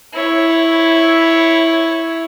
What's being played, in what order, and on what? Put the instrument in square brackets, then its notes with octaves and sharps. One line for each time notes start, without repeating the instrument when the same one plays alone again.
[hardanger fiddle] E4 C#5